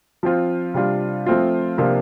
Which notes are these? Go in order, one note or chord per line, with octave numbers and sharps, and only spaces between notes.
F3 C4 F4
C3 G3 D4 F4
F3 A3 C4 F4
C3 F3 A#3 D4 F4